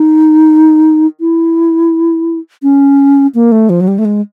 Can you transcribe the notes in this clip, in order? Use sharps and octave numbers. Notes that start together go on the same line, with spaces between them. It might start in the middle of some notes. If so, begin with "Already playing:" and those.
Already playing: D#4
E4
C#4
A#3
A3
F3
F#3
G3
A3
G#3